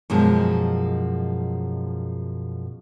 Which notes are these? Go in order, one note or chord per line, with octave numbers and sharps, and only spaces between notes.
F#2 B2 F3 G#3